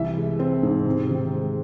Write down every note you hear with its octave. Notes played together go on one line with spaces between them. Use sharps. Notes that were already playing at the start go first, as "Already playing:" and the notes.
Already playing: C2 E3 E5
G#3
C4
G#2
C3
D#3
G#3